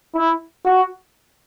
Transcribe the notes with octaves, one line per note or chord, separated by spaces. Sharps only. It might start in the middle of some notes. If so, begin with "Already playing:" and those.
E4
F#4